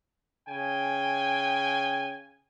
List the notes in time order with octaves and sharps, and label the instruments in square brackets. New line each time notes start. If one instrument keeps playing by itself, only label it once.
[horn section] C#3 G5 G#5